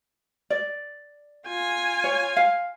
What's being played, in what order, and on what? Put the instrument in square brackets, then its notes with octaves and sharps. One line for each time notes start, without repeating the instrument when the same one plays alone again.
[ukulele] D5
[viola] F4 G#5
[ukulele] C#5
F5